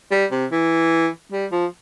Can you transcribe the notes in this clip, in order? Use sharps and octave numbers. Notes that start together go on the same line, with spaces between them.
G3
C3
E3
G3
F3